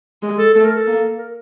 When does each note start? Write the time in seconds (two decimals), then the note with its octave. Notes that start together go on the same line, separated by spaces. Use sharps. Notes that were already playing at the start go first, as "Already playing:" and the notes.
0.22 G#3
0.38 A4
0.54 A3 A4
0.65 A#4
0.76 A4
0.86 A#3
1.18 A#4